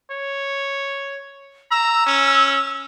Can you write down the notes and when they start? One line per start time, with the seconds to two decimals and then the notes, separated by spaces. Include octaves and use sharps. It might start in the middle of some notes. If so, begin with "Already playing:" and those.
0.11 C#5
1.71 A#5 E6
2.06 C#4